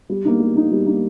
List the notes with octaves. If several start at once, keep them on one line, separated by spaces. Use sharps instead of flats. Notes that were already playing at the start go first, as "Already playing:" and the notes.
G3
A#3 D#4
G3
A#3 D#4
G3
A#3 D#4